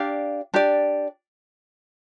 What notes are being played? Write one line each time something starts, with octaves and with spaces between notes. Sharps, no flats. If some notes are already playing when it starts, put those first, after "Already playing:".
Already playing: D4 G4 D5 F5
D4 G4 D5